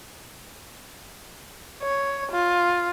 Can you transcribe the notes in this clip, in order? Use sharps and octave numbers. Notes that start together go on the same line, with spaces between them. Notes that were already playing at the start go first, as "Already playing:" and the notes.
C#5
F4